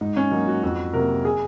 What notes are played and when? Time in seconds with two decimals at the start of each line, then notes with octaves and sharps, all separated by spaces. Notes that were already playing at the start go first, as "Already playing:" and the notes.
0.01 G#2 D#4
0.16 C#4
0.31 F#3 A#3 D#4
0.47 F#4
0.63 F2 F#4
0.93 C3 F#3 A#3 A#4
1.25 G#4